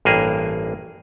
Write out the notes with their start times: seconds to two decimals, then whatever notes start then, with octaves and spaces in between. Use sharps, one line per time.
0.05 A1 G2 A#3 G#4